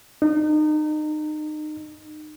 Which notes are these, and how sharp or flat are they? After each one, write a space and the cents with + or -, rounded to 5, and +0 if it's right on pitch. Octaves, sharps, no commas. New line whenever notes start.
D#4 -30